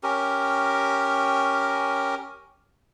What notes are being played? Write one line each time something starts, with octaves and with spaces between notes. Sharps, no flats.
C#4 G4 A#4